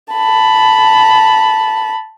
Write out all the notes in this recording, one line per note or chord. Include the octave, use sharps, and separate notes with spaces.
A5 B5